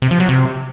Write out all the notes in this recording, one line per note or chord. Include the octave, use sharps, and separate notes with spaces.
C3
F3
F#3
C3